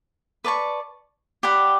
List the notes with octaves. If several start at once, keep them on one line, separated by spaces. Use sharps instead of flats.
B4 D5 A5 C#6
G4 D5 F#5 B5